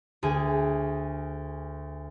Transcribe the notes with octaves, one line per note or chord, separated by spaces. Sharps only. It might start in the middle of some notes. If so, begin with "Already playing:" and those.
D2 G#4 G#5